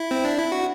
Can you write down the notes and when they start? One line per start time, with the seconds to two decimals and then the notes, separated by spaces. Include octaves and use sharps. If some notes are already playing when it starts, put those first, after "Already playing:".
Already playing: E4
0.11 C4
0.25 D4
0.38 E4
0.52 F#4